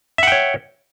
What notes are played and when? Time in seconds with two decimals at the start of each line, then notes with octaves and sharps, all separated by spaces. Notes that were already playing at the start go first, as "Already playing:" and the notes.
0.18 E5
0.23 F#5
0.27 G5
0.32 C#5